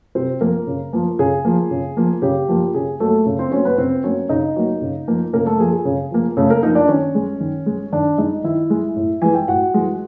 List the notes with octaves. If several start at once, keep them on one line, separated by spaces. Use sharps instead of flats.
C3 C4 C5
F3 A#3 A#4
C#3
F3 A#3
C#3 G#4
F3 A#3
C#3
F3 A#3
C#3 G4
F3 A#3
C#3 G#4
F#3 A3 A#3 A4
C#3
C4 C5
F#3 A#3 C#4 C#5
B3 B4
C#3 C4 C5
F#3 A#3 C#4 C#5
C#3 D#4 D#5
F#3 A#3
C#3
F3 A#3
C#3 A#3 A#4
A3 A4
F3 A#3 G#4
G#4
C#3
F3 A#3
C#3 A3 A4
A#3 A#4
F3 A#3 D#4 D#5
D4 D5
D#3 C#4 C#5
G#3
D#3
G#3
D#3 D4 D5
G#3 D#4 D#5
D#3 E4 E5
G#3
A2
E3 G#3 G#5
G5
A2 F#4 F#5
E3 G#3